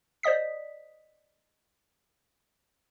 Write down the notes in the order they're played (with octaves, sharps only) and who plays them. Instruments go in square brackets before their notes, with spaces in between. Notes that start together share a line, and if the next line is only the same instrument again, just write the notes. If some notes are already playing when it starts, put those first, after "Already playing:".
[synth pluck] C5 D5 D#5 D#6 B6